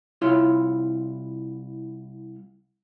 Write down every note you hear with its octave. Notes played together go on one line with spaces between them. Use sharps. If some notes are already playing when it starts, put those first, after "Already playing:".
C2 E4 F4 C#5 C6